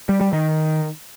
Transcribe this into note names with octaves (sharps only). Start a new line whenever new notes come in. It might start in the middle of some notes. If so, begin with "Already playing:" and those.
G3
G3
D#3